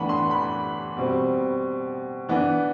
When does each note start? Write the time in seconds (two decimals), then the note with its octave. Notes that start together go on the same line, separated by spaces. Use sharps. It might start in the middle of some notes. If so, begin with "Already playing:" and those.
Already playing: A2 E3 B3 D4 A5 B5
0.09 C6
0.31 B5
0.97 B2 G3 C4
2.29 E3 B3 D4